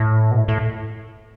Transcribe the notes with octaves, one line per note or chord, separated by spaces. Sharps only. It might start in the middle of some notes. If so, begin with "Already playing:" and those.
Already playing: A2
B2
A2
A2